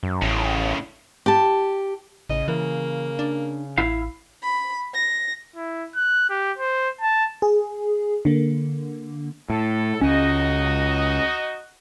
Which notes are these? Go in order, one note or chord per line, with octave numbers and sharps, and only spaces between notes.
F#2
A1 A2 C#3
G4 A5
A1 C#3 D#5
E3 A#3
D4
A1 E4 F5
B5
A#6
E4
F#6
G4
C5
A5
G#4
D3 A#3
A2 A4
C#2 C#4 D#4 F#4 D#5